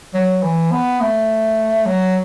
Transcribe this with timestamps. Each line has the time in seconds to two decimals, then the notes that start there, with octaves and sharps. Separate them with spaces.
0.14 F#3
0.43 E3
0.72 B3
1.01 A3
1.86 F#3